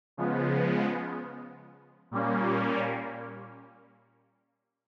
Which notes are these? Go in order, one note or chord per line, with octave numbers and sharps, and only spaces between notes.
C#3 F3 G#3 B3
A#2 G3 A#3 C#4